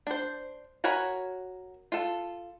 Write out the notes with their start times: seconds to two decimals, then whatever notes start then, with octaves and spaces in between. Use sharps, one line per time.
0.07 D4 C5
0.84 F#4 A#4 C#5 G#5 B5
1.92 F4 A4